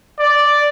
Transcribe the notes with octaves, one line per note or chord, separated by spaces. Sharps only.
D5